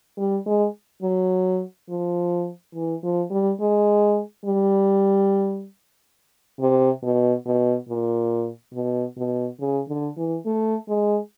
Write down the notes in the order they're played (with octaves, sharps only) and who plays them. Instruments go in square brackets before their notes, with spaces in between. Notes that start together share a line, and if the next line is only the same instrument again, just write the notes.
[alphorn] G3
G#3
F#3
F3
E3
F3
G3
G#3
G3
C3
B2
B2
A#2
B2
B2
C#3
D3
E3
A3
G#3